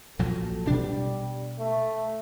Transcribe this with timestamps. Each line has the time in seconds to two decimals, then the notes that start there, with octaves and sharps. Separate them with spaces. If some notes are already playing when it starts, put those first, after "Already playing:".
0.19 A#1 A#2 F#3 A4
0.67 B2 G3 D4
1.60 A3